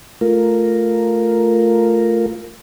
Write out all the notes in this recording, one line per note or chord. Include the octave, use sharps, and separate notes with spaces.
A3 F4 A#4